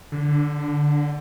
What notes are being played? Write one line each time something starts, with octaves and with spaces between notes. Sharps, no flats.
D3